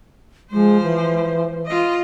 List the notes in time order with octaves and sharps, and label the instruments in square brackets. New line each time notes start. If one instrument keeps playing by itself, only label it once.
[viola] F3 C5 [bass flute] G#3
[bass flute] E3
[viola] F4 D#5